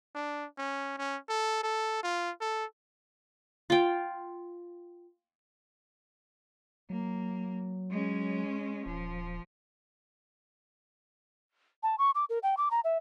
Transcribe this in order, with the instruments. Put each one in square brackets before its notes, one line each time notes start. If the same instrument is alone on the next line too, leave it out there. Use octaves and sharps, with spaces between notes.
[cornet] D4
C#4
C#4
A4
A4
F4
A4
[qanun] F4 G5
[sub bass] F#3 [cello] A#3
[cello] G#3 C#4
[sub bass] D#1 [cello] F3
[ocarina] A5
C#6
D6
A#4
G5
D6
A#5
E5